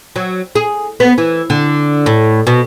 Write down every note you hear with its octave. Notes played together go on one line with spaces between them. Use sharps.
F#3
G#4
B3
E3
D3
A2
B2